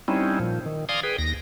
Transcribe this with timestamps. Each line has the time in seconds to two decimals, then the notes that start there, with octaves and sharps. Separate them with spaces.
0.08 G3 C4 C#4 D#4 E4
0.40 A#2 F3
0.66 D#3
0.89 D5 F5 G#5 A#5 C6 D#6
1.03 G#4 B4 G5
1.18 D#2 A#6